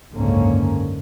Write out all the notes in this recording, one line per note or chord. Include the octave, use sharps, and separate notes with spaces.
F#1 C#2 G#2 D3 A#3 C#4